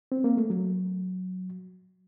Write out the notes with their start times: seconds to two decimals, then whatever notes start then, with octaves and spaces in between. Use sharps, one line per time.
0.12 C4
0.24 A#3
0.37 A3
0.50 F#3